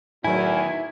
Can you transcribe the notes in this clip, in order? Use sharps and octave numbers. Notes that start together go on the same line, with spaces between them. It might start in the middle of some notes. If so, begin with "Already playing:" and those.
E2 A2 D#3 F#3 E4 G#5